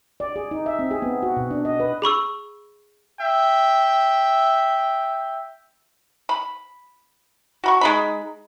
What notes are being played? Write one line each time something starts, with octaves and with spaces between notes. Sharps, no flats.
D5
G#4
D#4
E5
C4
G#4
B3
F#4
B2
D4
D#5
B4
G#4 B5 C#6 E6
E5 G5
B5
F#4 B5 C#6
G#3 D#4 B5